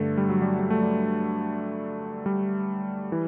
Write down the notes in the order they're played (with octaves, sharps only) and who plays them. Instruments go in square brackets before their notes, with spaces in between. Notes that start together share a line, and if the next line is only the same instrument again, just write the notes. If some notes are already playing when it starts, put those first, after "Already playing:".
Already playing: [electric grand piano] G2 D3 A3
G3
F#3
G3
G3
A3
G3
G3
E3